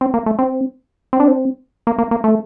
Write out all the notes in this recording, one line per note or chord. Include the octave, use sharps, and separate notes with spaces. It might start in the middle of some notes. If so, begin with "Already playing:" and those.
C4
A#3
A3
C4
C4
D4
C4
A#3
A#3
A#3
A3